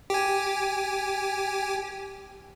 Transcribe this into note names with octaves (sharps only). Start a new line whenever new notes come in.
G4 G#5